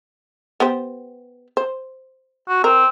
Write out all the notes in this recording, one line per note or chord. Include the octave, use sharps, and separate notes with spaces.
B3 G4 C5
C5
F#4
C4 A#4